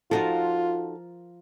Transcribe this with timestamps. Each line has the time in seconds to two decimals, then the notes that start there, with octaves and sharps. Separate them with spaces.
0.11 F3 D#4 F4 F#4 A4 A#4